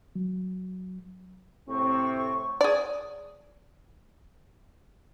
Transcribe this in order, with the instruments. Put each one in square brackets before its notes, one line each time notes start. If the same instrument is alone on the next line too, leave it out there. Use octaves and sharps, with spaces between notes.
[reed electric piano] F#3
[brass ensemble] A2 C3 C4 [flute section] C#6
[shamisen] G#4 D5